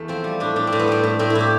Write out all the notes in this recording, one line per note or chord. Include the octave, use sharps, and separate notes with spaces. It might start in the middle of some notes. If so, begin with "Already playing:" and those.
Already playing: E2 A3 A4
F3 C4
G3
A2 D4
A2 D4
C4
A2
B3
G3 C4
A2
A2 C4
E4
A2
G4